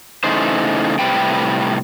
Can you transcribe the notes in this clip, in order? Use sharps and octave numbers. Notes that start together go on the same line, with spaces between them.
C#3 E3 A3 D#4 C5
A2 C3 G3 B4 G5